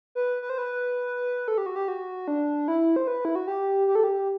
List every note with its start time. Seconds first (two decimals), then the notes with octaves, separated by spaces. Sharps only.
0.15 B4
0.42 B4
0.50 C5
0.58 B4
1.48 A4
1.58 G4
1.66 F#4
1.76 G4
1.88 F#4
2.28 D4
2.68 E4
2.96 C5
3.07 B4
3.25 E4
3.35 F#4
3.47 G4
3.87 G4
3.95 A4
4.04 G4